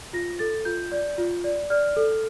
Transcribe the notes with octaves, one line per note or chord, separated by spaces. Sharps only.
F4 A#6
A4 A6
F4 G6
D5
F4
D5
D5 F6
A4